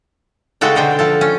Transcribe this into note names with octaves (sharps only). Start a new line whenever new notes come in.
C#3 G#3 F#4 A4 G5
B2 D3 C5 G5 G#5
F3 A4
C#4